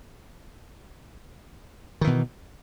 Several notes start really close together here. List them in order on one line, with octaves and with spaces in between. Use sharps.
D#3 E3 B2